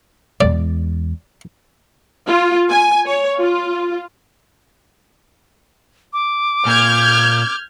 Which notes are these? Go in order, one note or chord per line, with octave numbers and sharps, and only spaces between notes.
E2 G#3 D5
F4
G#5
C#5
F4
D6
A#2 F6 G6 G#6